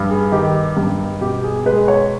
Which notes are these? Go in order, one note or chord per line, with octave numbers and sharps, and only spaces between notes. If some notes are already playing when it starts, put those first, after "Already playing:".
Already playing: G2
G#4
D#3 G4
G2
B2 G4
G#4
G#3 B4
C#5